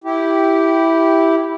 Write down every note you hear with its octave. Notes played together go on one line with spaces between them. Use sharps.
E4 G4